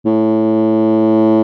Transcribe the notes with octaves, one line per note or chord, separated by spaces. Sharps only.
A2